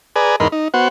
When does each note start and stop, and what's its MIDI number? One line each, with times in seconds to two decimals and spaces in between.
0.16 0.36 68
0.16 0.36 71
0.16 0.36 74
0.16 0.36 80
0.16 0.36 82
0.40 0.48 40
0.40 0.48 44
0.40 0.48 63
0.40 0.48 70
0.40 0.48 83
0.40 0.48 84
0.52 0.68 63
0.74 0.88 59
0.74 0.88 66
0.74 0.88 72
0.74 0.88 78